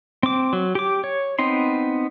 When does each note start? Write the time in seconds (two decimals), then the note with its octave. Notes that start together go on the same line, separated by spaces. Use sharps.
0.23 C4 D6
0.53 F#3
0.75 G4 D6
1.04 C#5
1.39 B3 C4 D#4 C6